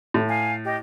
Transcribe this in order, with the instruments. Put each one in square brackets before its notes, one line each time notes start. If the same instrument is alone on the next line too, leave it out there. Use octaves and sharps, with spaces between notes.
[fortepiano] A2
[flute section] F5 G#5
G4 D#5